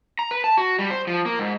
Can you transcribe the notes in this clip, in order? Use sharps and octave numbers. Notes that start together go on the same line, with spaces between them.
A#5
B4
A5
F#4
G3
C5
F3
A#3
G#2